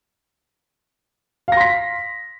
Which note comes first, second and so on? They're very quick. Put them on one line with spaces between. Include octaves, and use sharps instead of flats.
F5 A#6 C6 B6